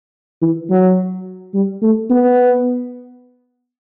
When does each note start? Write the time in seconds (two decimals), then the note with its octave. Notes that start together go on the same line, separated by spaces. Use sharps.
0.42 E3
0.70 F#3
1.54 G3
1.82 A3
2.10 B3